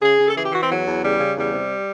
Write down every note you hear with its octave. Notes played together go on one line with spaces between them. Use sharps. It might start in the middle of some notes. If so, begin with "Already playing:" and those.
C#3 G#4
C#3
A4
E3 G#4
G4
E3 F#4
C4
E2 F#3
E2
C#3 G3
C#3
E2 G3
C3